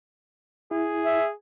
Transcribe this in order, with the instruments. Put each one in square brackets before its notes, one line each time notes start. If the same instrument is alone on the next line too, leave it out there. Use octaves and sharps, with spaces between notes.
[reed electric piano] E4 [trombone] G#4
[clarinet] E5